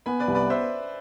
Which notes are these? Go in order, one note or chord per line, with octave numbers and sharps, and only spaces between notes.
B3 G#5 B5
B4 D5
C2
B4 D5
C5 E5